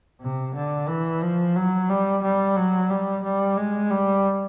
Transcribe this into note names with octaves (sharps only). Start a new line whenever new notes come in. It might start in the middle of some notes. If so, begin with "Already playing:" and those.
C3
D3
E3
F3
F#3
G3
G3
F#3
G3
G3
G#3
G3